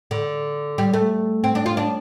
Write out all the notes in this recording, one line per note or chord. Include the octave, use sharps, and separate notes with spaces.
D3
G3
A3
C4
D4
F4
D4